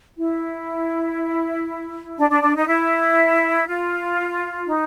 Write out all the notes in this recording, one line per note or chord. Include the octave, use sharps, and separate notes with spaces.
E4
D4
D4
D4
D#4
E4
F4
D#4